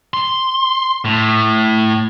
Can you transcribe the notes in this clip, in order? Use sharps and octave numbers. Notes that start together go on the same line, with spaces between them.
C6
A2